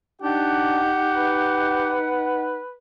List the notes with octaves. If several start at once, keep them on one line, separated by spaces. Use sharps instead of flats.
D4 D#4 G4 F#5
B4